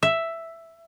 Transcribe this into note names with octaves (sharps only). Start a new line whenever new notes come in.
E5